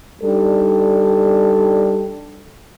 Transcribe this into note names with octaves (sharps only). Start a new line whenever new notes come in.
G3 D4 D#4 A4